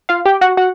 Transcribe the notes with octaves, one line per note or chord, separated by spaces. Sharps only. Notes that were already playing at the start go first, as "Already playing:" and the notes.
F4 F5
G4 G5
F#4 F#5
F#4 F#5